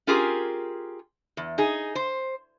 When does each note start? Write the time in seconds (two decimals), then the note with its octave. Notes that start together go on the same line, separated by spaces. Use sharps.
0.07 C#4 F4 G4 G#4 A#4
1.37 E2
1.58 D#4 G#4
1.95 C5